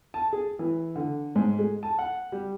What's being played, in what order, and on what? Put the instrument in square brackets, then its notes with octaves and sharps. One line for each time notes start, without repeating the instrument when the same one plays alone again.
[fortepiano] A5
G#4
E3
D3
G#2
G#3
A5
F#5
G3